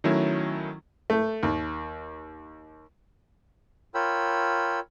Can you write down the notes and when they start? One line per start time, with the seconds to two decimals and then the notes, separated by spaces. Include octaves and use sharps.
0.04 D#3 F#3 A3 C#4 E4
1.10 A3
1.43 D#2
3.95 F4 A#4 C#5 G5 B5 E6